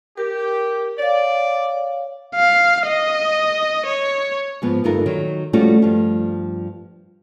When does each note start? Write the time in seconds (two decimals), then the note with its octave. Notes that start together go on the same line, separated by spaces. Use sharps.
0.18 G4 A#4
0.98 C#5 D5 F5
2.36 F5
2.87 D#5
3.86 C#5
4.62 G#2 F3 B3
4.84 D2 G2 D#4 F4 A4 A#4
5.06 D#3 F#3
5.53 F3 G3 A3 C#4 F4 F#4
5.82 G2 F3